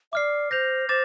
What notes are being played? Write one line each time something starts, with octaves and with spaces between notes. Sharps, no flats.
D5 E5 D6 F6 C7
C5 G6 A#6 F7
C5 D6 A6 E7